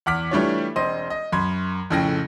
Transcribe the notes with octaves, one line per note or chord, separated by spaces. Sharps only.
E2 F#5 D6 F6 B6
E3 G3 A3 D4 F4 C#5
E1 C4 D#5 C6 D#7
D#5
F#2 B5 C6 G#6
F2 A2 C#3 G5 A#6